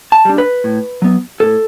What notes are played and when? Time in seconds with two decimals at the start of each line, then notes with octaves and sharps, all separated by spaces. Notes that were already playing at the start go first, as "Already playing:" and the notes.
0.12 A5
0.25 G3 D4
0.38 B4
0.64 A2
1.02 F#3 B3
1.40 A2 A4